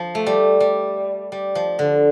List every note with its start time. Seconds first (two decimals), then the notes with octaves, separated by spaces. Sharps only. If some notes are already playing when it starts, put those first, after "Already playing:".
Already playing: F3
0.15 A3
0.26 G3
0.60 G3
1.32 G3
1.55 F3
1.79 D3